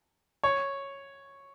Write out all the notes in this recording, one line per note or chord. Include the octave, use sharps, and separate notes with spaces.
C#5